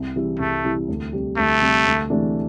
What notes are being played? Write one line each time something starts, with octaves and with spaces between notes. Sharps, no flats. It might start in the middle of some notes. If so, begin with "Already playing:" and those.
Already playing: C2
C3 E3 G3 E4
C2 A3
C3 E3 G3 E4
D2
C3 G3
D2 A3
C3 G3
D2
C3 E3 A3 D4